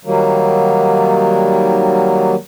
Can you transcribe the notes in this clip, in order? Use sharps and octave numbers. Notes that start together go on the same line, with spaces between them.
D#3 F#3 G3 A#3